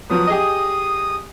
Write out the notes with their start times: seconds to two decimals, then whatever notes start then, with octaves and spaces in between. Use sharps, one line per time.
0.09 F3 F#3 B3 D#6
0.27 G4 G#4 D#5